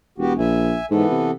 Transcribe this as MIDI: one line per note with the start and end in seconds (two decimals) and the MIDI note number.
0.18 0.38 28
0.18 0.33 59
0.18 0.33 66
0.18 0.33 67
0.38 0.78 34
0.38 0.86 76
0.38 0.86 80
0.91 1.05 44
0.91 1.31 52
0.91 1.31 59
0.91 1.31 69
1.11 1.33 48